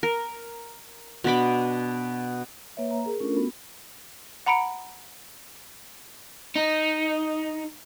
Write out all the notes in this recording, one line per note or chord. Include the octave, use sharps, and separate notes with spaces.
A#4
B2 D4 B5 D6
A#3 B4 C#5 E5
A#5
G#4 A#4
A3 C#4 D4 F4 A4 A#4
B3 F#4
F#5 A#5 B5 C#7 D7
D#4